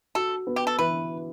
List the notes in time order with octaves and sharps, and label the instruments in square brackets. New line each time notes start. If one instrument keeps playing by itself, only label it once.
[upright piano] F#4 [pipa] A4
[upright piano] B3
[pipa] G4
A4
[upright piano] E3 [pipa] B4